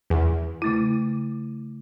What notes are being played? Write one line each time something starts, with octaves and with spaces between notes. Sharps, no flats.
E2
C#3 A3 E4